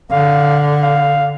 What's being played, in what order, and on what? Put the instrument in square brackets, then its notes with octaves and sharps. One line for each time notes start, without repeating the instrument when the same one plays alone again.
[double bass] D3 [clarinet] F5
[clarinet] F5